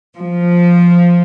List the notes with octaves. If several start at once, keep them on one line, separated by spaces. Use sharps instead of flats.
F3